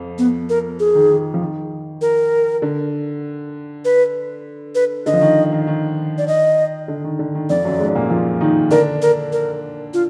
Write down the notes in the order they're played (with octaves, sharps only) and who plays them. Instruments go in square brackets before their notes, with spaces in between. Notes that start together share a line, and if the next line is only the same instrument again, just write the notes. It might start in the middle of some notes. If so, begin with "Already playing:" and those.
Already playing: [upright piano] F2 F3
[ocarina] B3
A#4
G#4
[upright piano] D#3
D#3
F3
D#3
[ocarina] A#4
[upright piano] D3
[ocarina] B4
B4
[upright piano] D3 [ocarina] D#5
[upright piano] F3
D#3
D#3
D#3
[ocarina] D5
D#5
[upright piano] D3
D#3
D3
D#3
[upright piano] F2 F3 [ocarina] D5
[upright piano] F#2 F#3
G#2 G#3
A#2 A#3
F3 F4
D#3 D#4
[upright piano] D3 D4 [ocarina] A#4
[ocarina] A#4
A#4
F4